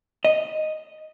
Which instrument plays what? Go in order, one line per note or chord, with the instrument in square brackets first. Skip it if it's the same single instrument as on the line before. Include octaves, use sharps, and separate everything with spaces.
[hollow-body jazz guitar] D#5